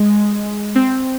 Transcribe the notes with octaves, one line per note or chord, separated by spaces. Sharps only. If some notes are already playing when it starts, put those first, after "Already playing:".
Already playing: G#3
C4